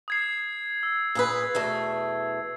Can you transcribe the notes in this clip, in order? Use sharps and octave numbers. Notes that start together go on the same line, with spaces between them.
D#6 G#6 C7
E6
A#2 G#4 B4
E2 B2 A3